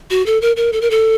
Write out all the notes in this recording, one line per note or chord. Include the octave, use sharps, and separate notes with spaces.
F#4
A4
A#4
A#4
A4
A#4
A4